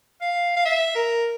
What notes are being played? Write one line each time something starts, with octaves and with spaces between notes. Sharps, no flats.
F5
F5
E5
A#4